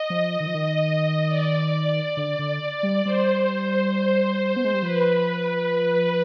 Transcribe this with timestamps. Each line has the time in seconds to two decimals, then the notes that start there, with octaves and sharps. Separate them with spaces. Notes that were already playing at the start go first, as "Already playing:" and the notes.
Already playing: D#5
0.10 F3
0.40 D#3
0.47 F3
0.54 D#3
1.28 D5
2.17 D3
2.39 D3
2.83 G3
3.05 G3 C5
4.56 B3
4.65 G#3
4.74 G3
4.83 F3 B4